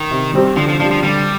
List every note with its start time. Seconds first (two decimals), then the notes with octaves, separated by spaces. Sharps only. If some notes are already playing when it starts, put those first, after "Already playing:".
Already playing: D#3
0.11 C3
0.34 G3 C4 G4
0.56 D3 F3
0.68 F3
0.79 F3 D4
0.82 G3
0.91 F3
1.03 D3 G3